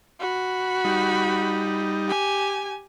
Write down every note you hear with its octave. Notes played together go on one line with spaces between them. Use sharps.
F#4 B5
G3 D#4
G4 G#5